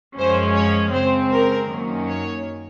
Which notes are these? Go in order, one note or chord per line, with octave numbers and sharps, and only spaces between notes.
F#2 F3 G#3 C#4 C5
C#5
C#3 G#3 C4 C5
A#4
F#2 D#3 F#3 A#3 C#4
C#5